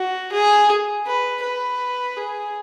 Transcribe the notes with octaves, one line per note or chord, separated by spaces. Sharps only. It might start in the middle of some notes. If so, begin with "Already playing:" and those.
Already playing: F#4
G#4
B4
B4
G#4